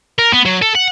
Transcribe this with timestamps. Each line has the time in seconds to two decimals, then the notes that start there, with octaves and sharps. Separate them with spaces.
0.19 A#4
0.33 B3
0.46 F#3
0.62 A4
0.75 F#5